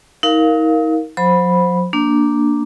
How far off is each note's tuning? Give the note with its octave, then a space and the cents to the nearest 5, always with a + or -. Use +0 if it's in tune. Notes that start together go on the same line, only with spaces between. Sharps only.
D#4 +40 A#4 +0 F5 +0
F#3 -45 C5 +0 B5 -5
A#3 +0 D4 +0